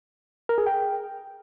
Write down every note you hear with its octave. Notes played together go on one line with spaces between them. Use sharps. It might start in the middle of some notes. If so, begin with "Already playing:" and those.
A#4
G#4
G5